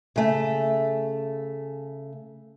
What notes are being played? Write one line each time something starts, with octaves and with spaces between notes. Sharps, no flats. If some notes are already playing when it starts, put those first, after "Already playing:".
C#3 A3